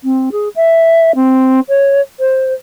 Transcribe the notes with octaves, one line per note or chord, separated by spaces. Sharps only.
C4
G#4
E5
C4
C#5
C5